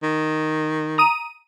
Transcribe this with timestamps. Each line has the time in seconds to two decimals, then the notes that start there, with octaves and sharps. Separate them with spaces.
0.03 D#3
0.98 A#5 D#6 D#7